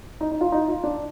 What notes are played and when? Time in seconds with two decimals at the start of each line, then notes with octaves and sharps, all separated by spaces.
0.21 D#4
0.31 D#4
0.41 F4
0.52 D#4
0.68 F4
0.83 D4